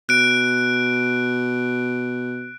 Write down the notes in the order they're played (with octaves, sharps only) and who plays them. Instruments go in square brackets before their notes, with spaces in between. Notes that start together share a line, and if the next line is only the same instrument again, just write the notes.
[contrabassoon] B2 [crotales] F#6 D7